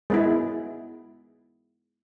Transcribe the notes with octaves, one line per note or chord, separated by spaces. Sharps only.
G#3 B3 E4